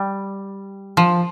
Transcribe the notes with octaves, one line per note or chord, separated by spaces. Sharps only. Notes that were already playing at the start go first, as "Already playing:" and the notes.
Already playing: G3
F3